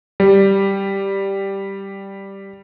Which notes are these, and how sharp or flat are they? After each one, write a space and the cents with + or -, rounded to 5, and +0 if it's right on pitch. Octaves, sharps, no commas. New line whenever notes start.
G3 +0